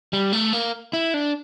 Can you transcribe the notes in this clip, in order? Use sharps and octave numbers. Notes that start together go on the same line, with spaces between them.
G3
A3
A#3
E4
D4